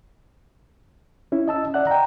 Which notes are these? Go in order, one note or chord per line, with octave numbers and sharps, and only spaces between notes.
C#4 E4
D#5 A5 E6
D5 E5 F#5 F#6
G5 A#5